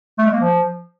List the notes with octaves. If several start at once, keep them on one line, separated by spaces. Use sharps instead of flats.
A3
G#3
A#3
F3